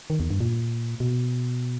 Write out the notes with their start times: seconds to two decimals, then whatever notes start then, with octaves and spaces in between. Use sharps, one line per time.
0.10 D#3
0.20 E2
0.31 G2
0.40 A#2
1.00 B2